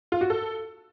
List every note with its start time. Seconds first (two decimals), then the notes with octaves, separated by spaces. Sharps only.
0.12 F4
0.21 F#4
0.30 A4